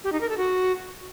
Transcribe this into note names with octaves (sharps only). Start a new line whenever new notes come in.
G4
D#4
A#4
A4
F#4